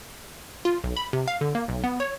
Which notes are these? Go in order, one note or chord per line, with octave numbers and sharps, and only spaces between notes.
F4
B1
B5
C3
F5
D3
A#3
B1
B3
C#5